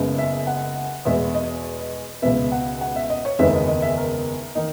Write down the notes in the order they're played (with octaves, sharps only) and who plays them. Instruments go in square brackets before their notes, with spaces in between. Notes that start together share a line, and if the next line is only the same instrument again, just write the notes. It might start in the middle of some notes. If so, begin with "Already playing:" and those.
Already playing: [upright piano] F#1 F#2 C#3 G#3 B3
E5
F#5
E2 B2 G#3 B3 E5
D#5
C#2 B2 G#3 B3 E5
F#5
F#5
E5
D#5
C#5
F#1 E2 D#3 G#3 B3 E5
D#5
D#5
E5
A#4
D#3 A#3 D#4